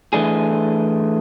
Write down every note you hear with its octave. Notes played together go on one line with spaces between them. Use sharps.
E3 A3 D4 G#4